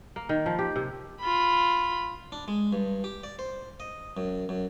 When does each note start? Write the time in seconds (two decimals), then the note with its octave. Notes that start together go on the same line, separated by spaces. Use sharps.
0.16 A#3
0.29 D#3
0.46 F3
0.59 G4
0.76 C3
1.21 F4 B5
2.32 D4
2.48 G#3
2.73 G2
3.04 G4
3.24 D5
3.39 C5
3.80 D#5
4.17 F#2
4.49 F#2